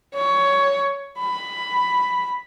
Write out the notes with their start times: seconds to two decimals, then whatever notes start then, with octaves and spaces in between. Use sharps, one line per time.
0.15 C#5
1.19 B5